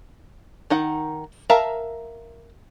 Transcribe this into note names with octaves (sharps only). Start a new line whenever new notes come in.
D#3 D#4 F#5
A#4 E5 F5 A5 A#5